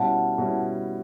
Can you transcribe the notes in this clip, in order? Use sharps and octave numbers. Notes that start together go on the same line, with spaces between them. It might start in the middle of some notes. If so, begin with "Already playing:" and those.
Already playing: B2 G3 C#4 E4 F#5 A5
B2 G3 C#4 E4